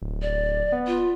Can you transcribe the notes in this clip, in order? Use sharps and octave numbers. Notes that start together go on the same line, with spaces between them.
D1
D5
B3
F4